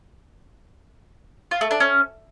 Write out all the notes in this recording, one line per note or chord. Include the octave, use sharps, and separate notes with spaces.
F4
A3
D4
C#4